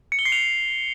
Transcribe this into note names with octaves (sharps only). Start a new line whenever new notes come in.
C#7
G7
C7
F7